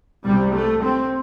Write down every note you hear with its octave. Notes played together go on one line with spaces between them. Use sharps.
C2 C3 G3
A3
C4